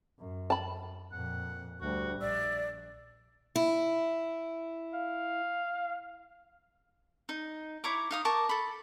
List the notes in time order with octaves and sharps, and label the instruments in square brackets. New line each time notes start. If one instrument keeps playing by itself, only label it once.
[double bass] F#2
[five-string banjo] A5 B5
[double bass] F2 A#2 [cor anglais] F#5
[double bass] D2 G3 [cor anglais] F#4
[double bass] A#1 [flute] D5 [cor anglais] E5
[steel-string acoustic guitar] E4
[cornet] F5
[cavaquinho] D#4
E4 C#5 A#5 D6
D#4 F5 D#6
A#4 A5 C#6 D6
A4 B5